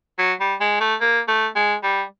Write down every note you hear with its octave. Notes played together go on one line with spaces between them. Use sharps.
F#3
G3
G#3
A3
A#3
A3
G#3
G3